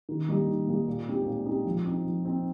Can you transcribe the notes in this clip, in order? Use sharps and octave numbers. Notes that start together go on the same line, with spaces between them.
D#3
G3 A#3 D#4 G4
D#3
G3 A#3 D#4 G4
A#2
G#3 C4 D#4 G4
A#2
G#3 C4 D#4 G4
F3
C4 D#4
F3
C4 D#4